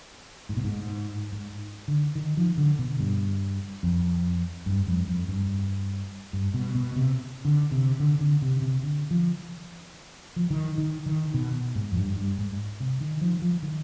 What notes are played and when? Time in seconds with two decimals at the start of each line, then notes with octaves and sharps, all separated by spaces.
0.49 G#2
0.57 B2
0.64 G#2
1.32 G#2
1.88 D3
2.15 D#3
2.37 F3
2.57 D3
2.79 B2
3.00 G2
3.83 F2
4.66 G2
4.87 F2
5.08 F2
5.28 G2
6.33 G2
6.54 B2
6.75 B2
6.96 C3
7.45 D3
7.72 C3
8.00 D3
8.21 D3
8.42 C3
8.62 C3
8.83 D3
9.11 F3
10.36 F3
10.51 D#3
10.78 D#3
11.06 D#3
11.34 B2
11.75 G#2
11.92 F2
11.97 G2
12.17 G2
12.38 G#2
12.80 C3
13.01 D#3
13.21 F3
13.42 F3
13.63 D#3